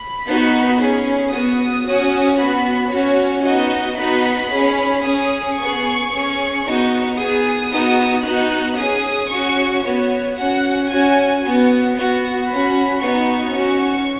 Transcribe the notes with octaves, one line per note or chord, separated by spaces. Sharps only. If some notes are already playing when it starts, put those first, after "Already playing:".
Already playing: B5
B3 D#4 F#4
C#4 G#4
B3 F#4 D#6
C#4 F#4
B3 F#4 B5
C#4 F#4 C#5
B3 D#4 F#4 D#5
B3 D#4 F#4 B5
C#4 G#4
C#4 G#4 D#6
B3 G#4 C#6
C#4 G#4
B3 D#4 F#4
B3 G#4 D#6
B3 D#4 F#4
B3 D#4 F#4 F#6
C#4 G#4 D#6
C#4 F#4 C#6
B3 F#4 C#5
C#4 F#4 F#5
C#4 F#4 G#5
B3 F#4
B3 F#4
C#4 F#4 B5
B3 D#4 F#4 C#6
C#4 F#4